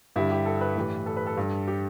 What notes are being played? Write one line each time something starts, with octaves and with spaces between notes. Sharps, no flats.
G2 D3 G3 E4
G4
A4
B4
A2 E3 G3
A4
B4
A4
G2 G3
G4